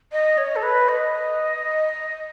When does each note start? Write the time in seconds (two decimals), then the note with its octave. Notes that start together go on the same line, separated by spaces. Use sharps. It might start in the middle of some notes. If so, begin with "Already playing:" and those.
0.13 D#5
0.38 C#5
0.56 A4
0.63 B4
0.89 D#5